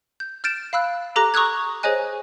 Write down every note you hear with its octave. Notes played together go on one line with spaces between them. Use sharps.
G6
F6 G6 A6 D7 E7
F5 B5 E6 F#6
G4 A4 A#5 D6 F#6 A#6
A#5 C#6 D#6 E6 F#6 G#6
G#4 C5 C#5 D#5 G#5 F#6